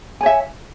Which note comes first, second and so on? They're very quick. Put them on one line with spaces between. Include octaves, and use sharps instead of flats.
G#5 C#5 E5